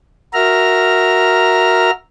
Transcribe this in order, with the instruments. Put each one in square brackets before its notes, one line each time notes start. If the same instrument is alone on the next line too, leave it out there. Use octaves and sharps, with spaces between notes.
[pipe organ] F#4 A#4 E5 A#5 F6